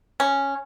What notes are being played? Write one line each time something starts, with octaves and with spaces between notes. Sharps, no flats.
C#4